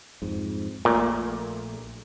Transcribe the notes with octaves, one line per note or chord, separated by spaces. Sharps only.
F2 G#2
A#1 A#2 A3